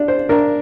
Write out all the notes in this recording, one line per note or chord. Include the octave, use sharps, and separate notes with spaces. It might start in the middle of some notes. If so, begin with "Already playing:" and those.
Already playing: D4 D5
C5
D4 A#4